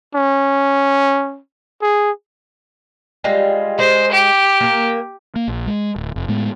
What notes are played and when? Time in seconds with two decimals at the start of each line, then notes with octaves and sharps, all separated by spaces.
0.15 C#4
1.82 G#4
3.24 G3 G#3 F4
3.79 G#3 C5
4.12 G4
4.61 A#3 A#4
5.36 A#3
5.48 A#1
5.67 G#3
5.96 D1
6.16 F1
6.28 A2 G#3 B3